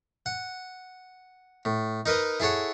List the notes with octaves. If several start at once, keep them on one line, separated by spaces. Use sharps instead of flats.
F#5
A2
D#4 A#4 B4 D#5
E4 G#4 A4 C#5 F#5